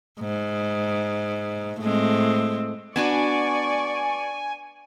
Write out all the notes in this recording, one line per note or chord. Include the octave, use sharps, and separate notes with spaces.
G#2
A2 G#3 C4
B3 D4 F#4 D5 G#5 C#6